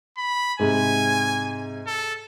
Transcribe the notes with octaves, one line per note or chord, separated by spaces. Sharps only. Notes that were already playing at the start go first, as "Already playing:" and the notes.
B5
G#2 C3 G#3 G#5
A4